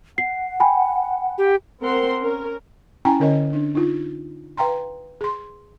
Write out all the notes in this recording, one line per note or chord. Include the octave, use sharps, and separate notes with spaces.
F#5 C7
G5 G#5 B5
G4
C4 A#4 F#5 C6
C#4 A#4
C#4 E4 G5 G#5 A#5
D3 C#4 A#4 C#5 D#5
D4
D#4 F4
B4 F5 G5 A#5 C6
G#4 C6